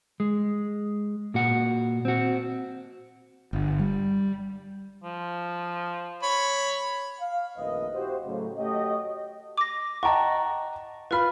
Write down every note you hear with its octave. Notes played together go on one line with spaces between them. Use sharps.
G#3
A#2 F#4 F#5
C4 F#4
G1
G3
F3
C#5 B5
F5
A#1 F2 D#3 A3 B4 D#5
E4 F#4 G4 C5
A2 C#3 F#3
A3 F#4 G4 C#5 D#5
D6 A#6
D#5 F#5 G5 A5 A#5 C#6
F4 B4 B5 F6